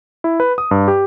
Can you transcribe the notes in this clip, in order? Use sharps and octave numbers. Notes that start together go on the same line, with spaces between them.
E4
B4
D#6
G2
G4